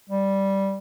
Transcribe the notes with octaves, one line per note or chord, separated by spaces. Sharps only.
G3